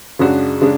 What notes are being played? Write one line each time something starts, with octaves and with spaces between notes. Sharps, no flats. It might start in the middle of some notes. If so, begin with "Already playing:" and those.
F#2 C#3 G#3 D4 F#4
C#3 G#3 D4